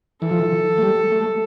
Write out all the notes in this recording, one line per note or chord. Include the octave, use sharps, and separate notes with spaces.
E3 A4
F3
E3
A3
G3
A3